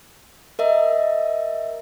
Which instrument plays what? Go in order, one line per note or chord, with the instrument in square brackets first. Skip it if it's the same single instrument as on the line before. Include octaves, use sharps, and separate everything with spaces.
[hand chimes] A#4 D#5 E5